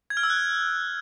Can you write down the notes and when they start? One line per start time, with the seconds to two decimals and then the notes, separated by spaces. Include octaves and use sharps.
0.10 G#6
0.17 F6
0.23 E6
0.30 F#6
0.36 G#6